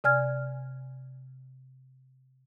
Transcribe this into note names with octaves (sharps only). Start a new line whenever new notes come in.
C3 D5 G#5 F6 G#6